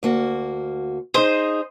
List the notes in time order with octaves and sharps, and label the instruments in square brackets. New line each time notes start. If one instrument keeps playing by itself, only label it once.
[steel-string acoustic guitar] D2 A#3 F#4
[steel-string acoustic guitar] D#4 G#4 [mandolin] C5 D#5